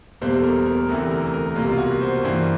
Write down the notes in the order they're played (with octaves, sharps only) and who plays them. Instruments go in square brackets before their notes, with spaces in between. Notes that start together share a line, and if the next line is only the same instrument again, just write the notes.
[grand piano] E2 B2 G3 A#3 C5
A4
A#4
A#4
D2 C3 E3 A3 A4
A#4
A#4
C2 B2 G3 A#3 F4
F4
F#4
C5
G2 E3 G3 A#3